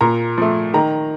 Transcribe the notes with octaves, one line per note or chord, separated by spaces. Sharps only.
A#2 A#5
F3 A3
D#3 A#5